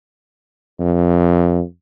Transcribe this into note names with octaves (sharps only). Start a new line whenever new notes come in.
F2